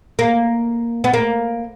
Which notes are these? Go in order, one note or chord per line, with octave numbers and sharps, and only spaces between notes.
A#3
B3
A#3